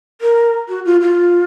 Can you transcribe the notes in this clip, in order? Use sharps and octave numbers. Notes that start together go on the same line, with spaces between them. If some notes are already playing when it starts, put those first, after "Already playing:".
A#4
F#4
F4
F4